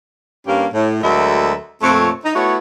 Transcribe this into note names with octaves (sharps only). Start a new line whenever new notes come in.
G2 A#3 C#4 G4 A#4 F5
A2
D2 F#3 G#3 A4 A#4 E5
F2 A#2 A3 C4 C#5
D#4
A3 B3 E4 F#4 C#5